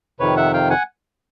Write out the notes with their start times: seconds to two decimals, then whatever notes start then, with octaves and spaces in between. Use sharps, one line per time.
0.20 F2 C3 D#3 B4 C#5
0.37 E5 F#5
0.53 F5 G5
0.70 F#5 G#5